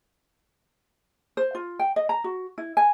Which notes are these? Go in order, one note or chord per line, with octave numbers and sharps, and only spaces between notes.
C5
F4
G5
D#5
A#5
F#4
E4
G#5